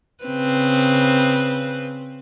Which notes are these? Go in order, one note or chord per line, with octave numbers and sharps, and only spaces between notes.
C#3 C4 B4